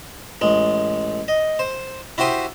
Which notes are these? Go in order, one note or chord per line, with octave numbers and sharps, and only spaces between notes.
A1 G#3
D#5
C5
E4 F#4 G4 C5 C6 D#6